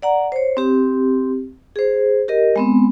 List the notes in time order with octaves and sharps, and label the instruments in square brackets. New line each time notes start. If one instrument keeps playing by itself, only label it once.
[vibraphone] D5 F#5 A#5
C5 C#5
C4 G4
G#4 C5
G4 A#4 D#5
G#3 B3 C4